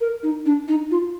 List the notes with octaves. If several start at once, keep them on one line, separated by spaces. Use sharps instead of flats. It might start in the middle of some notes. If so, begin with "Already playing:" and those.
A#4
D#4
D4
D#4
F4